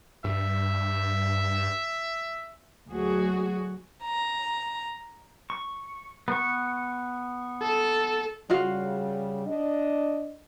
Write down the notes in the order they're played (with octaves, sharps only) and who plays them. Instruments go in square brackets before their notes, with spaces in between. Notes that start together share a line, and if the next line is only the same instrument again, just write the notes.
[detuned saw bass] G2 [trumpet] E5
[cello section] D2 F#3 F#4 G#4
[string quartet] A#5
[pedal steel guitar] C#6
B3 C#6
[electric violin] A4
[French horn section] C#3 G3 [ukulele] F4 F#4 F5
[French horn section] D4 D#5